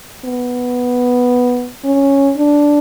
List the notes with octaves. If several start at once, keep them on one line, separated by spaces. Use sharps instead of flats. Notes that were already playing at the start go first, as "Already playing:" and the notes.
B3
C#4
D4